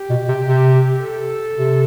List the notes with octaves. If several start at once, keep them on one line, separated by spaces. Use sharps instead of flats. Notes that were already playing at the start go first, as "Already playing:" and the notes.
Already playing: G4
B2
C3
C3
A4
C3